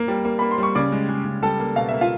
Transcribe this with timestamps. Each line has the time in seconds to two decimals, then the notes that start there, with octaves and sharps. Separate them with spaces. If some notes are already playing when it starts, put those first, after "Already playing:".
Already playing: A#3
0.08 G3
0.25 A#3
0.39 A#3 B5
0.51 C6
0.58 G3
0.63 C#6
0.75 C#3 D5 D6
0.92 G#3
1.09 G#3
1.25 C#3
1.43 G3 A4 A5
1.60 A#3
1.76 B2 F5
1.89 A#3 E5
2.01 F4 F5